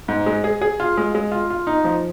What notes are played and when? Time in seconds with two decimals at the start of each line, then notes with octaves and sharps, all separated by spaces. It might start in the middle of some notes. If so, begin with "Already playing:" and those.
0.08 G#2
0.26 G#3
0.44 G#4
0.62 G#4
0.80 F4
0.97 G#3
1.15 G#3
1.32 F4
1.50 F4
1.67 D#4
1.84 F3